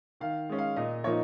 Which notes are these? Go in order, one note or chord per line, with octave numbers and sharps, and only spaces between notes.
D#3 F5
G#3 C#4
F5
A#2 D#5
F3 A#3 D#4 C#5